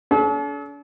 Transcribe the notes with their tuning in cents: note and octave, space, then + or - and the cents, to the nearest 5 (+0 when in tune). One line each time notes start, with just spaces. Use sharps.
D4 -45 A4 -45